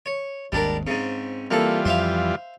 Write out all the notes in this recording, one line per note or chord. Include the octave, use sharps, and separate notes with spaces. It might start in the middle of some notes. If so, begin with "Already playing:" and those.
C#5
G#1 D#2 G3 G#3 D4 A#4
G#2 C#3 C4
E3 G3 A#3 F4 A4
F2 F3 C5 E5 F5